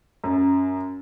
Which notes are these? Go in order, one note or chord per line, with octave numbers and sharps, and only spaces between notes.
F#2